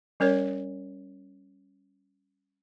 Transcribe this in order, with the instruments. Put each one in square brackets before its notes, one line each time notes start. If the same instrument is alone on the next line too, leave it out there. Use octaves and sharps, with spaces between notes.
[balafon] G3 C#4 A#4 C#5